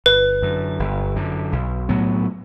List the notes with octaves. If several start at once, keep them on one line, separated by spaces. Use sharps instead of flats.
G1 B4
F#2 D3
G1
F#2 D3
B1
A2 F#3 B3